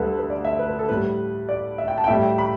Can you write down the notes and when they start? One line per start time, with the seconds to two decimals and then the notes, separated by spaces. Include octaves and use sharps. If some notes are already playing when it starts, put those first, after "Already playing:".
Already playing: D2 D3 G3 A4 B4
0.19 B4
0.30 D5
0.45 E5
0.59 B4
0.69 B4
0.79 A4
0.89 A2 G3 B4
1.49 D5
1.78 E5
1.88 G5
1.98 A5
2.04 G5
2.08 A2 G3 E5
2.23 G5
2.38 B5